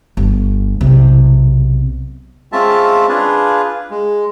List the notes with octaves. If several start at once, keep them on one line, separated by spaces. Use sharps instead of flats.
G1
B1 C3
G#3 C4 C#4 F4 E5 A5
D4 F4 G#4 B4
G#3